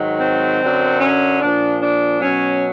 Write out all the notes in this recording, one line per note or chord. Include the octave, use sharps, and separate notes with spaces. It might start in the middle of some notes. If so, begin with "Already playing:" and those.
Already playing: G#2 D#3 F#3
C4
F#2 D3 F#3
C#4
A#2 F3 D4
D4
B2 F#3 C#4